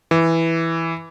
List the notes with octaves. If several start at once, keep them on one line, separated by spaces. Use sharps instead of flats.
E3